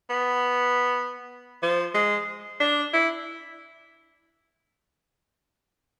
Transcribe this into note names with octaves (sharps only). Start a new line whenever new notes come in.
B3
F3
G#3
D4
E4